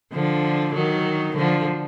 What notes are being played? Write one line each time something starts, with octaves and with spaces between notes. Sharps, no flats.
D3 F3
D#3 F#3
D3 F3